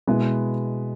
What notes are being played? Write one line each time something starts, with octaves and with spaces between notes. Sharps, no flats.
B2 G#3 B3 E4 B4